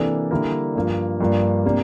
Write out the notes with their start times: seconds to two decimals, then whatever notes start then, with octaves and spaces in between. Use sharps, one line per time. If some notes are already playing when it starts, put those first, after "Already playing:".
Already playing: C3 E3 A#3 D4 A4
0.31 D3 G3 A#3 E4 A#4
0.75 G2 F3 A#3
1.20 G2 F3 A#3 D4
1.65 C3 G3 A#3 D4